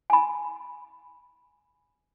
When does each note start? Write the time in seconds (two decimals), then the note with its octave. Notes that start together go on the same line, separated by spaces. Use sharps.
0.10 G#5 B5